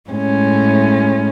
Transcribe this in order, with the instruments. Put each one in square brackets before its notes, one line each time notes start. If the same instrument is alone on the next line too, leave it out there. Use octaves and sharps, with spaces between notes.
[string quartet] A2 G#3 C#4